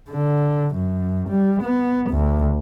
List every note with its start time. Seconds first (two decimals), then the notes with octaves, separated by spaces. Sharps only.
0.10 D3
0.75 F#2
1.29 G3
1.63 B3
2.11 D2